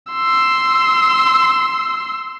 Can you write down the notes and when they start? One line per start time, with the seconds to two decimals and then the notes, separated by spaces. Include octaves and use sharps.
0.12 C6 E6